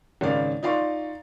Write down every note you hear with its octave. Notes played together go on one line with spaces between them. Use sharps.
G#1 C#3 D5 F5
D#4 F4 D5 F5 C6 C#6